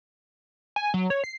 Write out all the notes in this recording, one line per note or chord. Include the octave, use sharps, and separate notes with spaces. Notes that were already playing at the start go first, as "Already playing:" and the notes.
G#5
F#3
C#5
C7